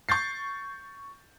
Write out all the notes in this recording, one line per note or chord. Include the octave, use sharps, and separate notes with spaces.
C#6 G6 A6 C7